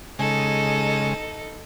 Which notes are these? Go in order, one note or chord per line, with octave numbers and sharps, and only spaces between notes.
C#3 G#3 D#4 A4